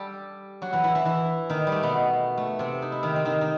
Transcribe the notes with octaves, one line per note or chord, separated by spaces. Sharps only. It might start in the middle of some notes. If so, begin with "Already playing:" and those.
Already playing: G3 G4 A4
F#3 F#4
E3 E4
E3 E4
E3 E4
E3 E4
D#3 D#4
G3
A3
B2 B3
A3
C3 C4
D#4
E4
D#3 D#4
C4
D#3 D#4
D#4